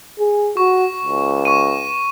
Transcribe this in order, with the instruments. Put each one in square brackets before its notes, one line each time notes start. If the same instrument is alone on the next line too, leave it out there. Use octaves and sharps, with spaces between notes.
[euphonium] G#4
[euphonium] F#4 [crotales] C#6
[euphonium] C#2
[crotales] C#6 D#7